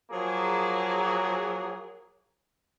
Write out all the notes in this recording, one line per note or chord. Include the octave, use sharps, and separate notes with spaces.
F3 F#3 A#3 G#4